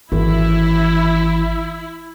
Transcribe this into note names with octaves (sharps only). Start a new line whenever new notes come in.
G#1 E3 E4